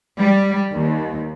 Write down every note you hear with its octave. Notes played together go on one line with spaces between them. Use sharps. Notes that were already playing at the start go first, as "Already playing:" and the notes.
G3
D#2